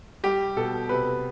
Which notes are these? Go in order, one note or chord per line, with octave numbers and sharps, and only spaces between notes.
G3 G4
B2 A4
C3 B4